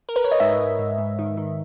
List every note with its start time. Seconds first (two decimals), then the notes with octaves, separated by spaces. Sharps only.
0.09 A#4
0.16 B4
0.24 C#5
0.31 D#5
0.40 G#2 E5
0.59 G#2
0.79 G#2
0.98 G#2
1.19 D#3
1.37 D#3